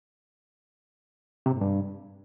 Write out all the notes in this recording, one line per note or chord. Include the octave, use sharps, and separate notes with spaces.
C3
G2
A2
G2